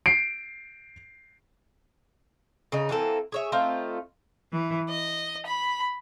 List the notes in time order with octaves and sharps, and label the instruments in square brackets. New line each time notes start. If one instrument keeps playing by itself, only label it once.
[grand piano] C7 D7
[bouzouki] C#3 D#4
E3 A#3 C4 A4
G#4 C#5 E5
A3 C4 D#4 F4
[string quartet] E3
D#5
B5